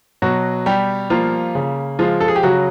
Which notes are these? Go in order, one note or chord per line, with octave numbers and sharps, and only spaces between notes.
B2 F#3 F#4
G3 G4
F3 A#3 F4
C#3
F3 G#3 F4
A4
G#4
G4
C#3 F#3 F#4